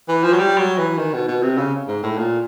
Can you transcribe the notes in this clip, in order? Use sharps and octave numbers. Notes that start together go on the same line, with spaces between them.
E3
F3
F#3
G3
F#3
E3
D#3
B2
B2
C3
C#3
G#2
A2
A#2